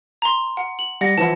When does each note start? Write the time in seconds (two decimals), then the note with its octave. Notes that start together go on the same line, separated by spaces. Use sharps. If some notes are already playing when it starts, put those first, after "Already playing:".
0.22 A#5 C6
0.57 F#5
0.79 F#7
1.01 G3 F#5 A#6
1.18 E3 F3 E4 F#5 A5